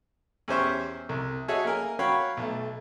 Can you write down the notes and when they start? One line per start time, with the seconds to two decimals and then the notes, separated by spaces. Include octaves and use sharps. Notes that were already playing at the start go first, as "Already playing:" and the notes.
0.48 E2 C#4 G4 C5 E5 C#6
1.09 C2
1.48 F#4 G#4 A4 C#5 D#5 E5
1.65 A#3 A#4 G#5
1.99 F#4 C#5 F5 G5 B5
2.37 B1 A3